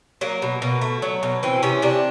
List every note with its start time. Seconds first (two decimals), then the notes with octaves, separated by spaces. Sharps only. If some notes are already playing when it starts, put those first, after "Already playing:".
0.21 F#3 A#3
0.42 B2
0.62 B2
0.81 A3
1.02 F#3
1.23 B2
1.43 E3 C4
1.63 C3 C#4
1.82 C3 D4